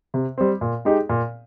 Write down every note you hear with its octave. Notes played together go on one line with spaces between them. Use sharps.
C3
G3 C4
A#2
G#3 D#4 G4
A#2